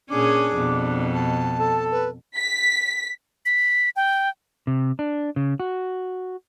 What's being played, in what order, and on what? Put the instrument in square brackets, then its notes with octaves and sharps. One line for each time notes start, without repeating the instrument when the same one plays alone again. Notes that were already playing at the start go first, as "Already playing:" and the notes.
[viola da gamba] A#2 C#4 G#4 [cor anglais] D4 [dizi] D6
[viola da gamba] F2 B2
[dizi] A5
[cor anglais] A4
[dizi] B4
[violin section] B6
[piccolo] B6
G5
[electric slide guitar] C3
D4
C#3
F#4